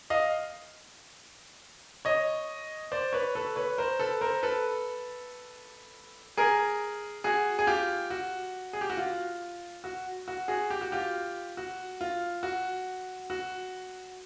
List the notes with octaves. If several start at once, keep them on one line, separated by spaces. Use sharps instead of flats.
D#5 F5
C#5 D#5
C5 D5
B4 C#5
A4 B4
B4 C#5
A#4 C5
A4 B4
A#4 C5
A4 B4
G#4 A#4
F#4 G#4
G#4
F4 G4
F#4
G#4
G4
F#4
F4
F#4
F#4
F#4 G#4
G4
F#4
F4 G4
F#4
F4
F#4
F#4